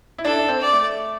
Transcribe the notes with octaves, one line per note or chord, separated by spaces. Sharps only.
E4
D4 A4
D4
C4
D5
A3